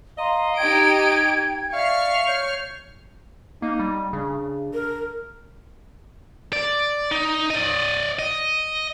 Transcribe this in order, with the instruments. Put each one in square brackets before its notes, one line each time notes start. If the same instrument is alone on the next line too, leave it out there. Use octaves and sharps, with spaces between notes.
[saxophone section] D#5 [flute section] F5 A#5 C6
[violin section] D#4 G4 D7 [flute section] G5 G#6
[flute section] D5 E5 [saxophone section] F5 [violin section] C#6 F6 C7
[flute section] C#5 G6
[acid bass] A#3 [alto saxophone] D#4
[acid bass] G3
[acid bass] C#3 [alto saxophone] D4
[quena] A#4
[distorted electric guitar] D5
D#4
D5 D#5
D#5